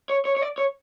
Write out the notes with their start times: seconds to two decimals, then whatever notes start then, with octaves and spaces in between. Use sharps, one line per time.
0.10 C#5
0.25 C#5
0.37 C#5
0.42 D5
0.58 C#5